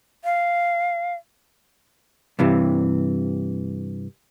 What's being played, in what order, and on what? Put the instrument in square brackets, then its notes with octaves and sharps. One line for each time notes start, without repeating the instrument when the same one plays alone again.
[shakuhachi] F5
[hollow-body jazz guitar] G2 C3 E3